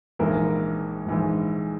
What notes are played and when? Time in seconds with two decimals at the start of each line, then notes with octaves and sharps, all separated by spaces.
0.19 A#1 G#2 E3 A#3 A#4
1.06 A#1 G#2 E3